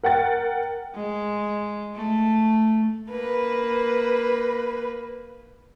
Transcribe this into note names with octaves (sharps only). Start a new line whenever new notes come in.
A#4 F#5 G5 A6
G#3
A3
A#3 B4